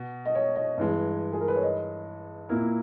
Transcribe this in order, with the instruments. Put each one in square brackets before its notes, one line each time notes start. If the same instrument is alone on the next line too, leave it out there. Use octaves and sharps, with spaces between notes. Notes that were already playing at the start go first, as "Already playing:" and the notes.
Already playing: [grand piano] B2
[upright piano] D#5
C#5
D#5
[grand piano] G2 E3 G#3
[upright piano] G#4
A#4
B4
C#5
D#5
[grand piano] A#2 A#3 E4 A#4